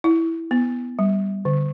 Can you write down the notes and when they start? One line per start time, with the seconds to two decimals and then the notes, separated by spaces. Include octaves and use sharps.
0.04 E4
0.51 B3
0.99 G3
1.45 D3